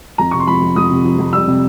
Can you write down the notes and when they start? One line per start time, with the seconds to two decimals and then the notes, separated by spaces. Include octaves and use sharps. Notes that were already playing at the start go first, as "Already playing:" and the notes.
0.18 F2 A#5
0.31 C3 C#6
0.40 C6
0.47 F3 B5
0.62 F2
0.76 F2 D#6
0.91 C3
1.05 F3
1.19 F2
1.33 G3 E6
1.48 C3